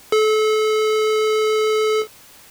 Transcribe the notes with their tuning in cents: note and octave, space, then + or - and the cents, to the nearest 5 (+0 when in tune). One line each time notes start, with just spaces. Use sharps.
A4 -30